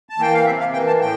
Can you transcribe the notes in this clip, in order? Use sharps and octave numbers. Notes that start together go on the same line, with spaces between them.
A5
E3 A#3 G5
F5
C3 E5
F5
E3 A#3 G5
A5
A2 G5